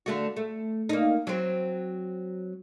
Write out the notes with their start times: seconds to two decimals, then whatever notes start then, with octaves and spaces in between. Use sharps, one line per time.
0.06 D3 A3 F#4
0.36 A3
0.89 A#3 D#4
1.27 F#3 C4